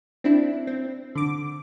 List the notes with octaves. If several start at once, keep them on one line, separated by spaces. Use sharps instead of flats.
C4 D4 E4
C4
D3 D6